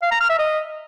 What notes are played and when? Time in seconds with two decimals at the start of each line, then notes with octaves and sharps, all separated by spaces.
0.02 F5
0.11 A#5
0.20 F6
0.30 E5
0.39 D#5